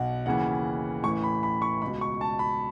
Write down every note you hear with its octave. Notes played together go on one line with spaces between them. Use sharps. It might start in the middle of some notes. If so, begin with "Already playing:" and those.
Already playing: B1 B2 F#5
D#2 C#3 E3 F#5
A1 A2 E3 C#6
B5
B5
C#6
C#2 B2 B5
C#6
A5
B5